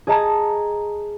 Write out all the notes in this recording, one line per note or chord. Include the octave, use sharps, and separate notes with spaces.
G#4 D#5 A5 A#5 G#6